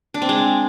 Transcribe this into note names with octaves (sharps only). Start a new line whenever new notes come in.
D4
C4
G#3